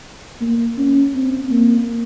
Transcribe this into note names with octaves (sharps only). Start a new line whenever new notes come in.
A#3
C#4
C4
A#3